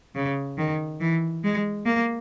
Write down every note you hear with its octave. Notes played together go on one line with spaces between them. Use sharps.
C#3
D#3
E3
G#3
A#3